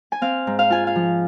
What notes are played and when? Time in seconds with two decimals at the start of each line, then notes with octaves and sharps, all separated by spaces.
0.12 G#5
0.21 C4 F5
0.47 G#2
0.59 F5
0.70 F4 G#5
0.87 F5
0.96 F3